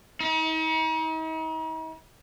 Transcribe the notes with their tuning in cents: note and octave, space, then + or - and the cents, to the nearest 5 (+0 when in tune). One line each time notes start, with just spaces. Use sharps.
D#4 +40